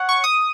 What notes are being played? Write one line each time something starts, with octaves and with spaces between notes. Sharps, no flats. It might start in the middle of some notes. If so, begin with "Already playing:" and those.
Already playing: C#5 F#5
C#6
D#6